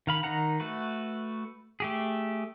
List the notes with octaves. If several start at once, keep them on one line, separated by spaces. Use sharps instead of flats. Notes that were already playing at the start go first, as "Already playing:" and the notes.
D#3 F5 B5
D#3 D#4 A#4 F#5 A#5
A3 F#4 B4
A3 G4 G#4